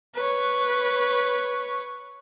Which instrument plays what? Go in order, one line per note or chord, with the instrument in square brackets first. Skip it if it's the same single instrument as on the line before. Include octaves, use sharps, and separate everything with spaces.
[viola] B4 C#5